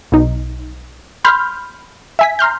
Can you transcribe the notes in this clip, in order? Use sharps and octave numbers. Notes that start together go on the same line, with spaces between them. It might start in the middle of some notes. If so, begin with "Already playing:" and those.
B1 D#4
B5 C6 F6 G6
E5 G#5 B6
A#5 C6 F6 G6